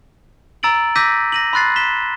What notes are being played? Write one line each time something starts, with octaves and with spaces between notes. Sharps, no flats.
A#5 E6 A6 D7 F#7
D6 E6 G6 A#6 B6 D#7
A#6 D#7 F#7
B5 C6 F#6 A6 C7
B6 E7 G7